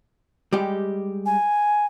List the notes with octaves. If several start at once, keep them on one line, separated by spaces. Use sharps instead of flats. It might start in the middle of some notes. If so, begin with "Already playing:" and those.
G3 G#3 G4
G#5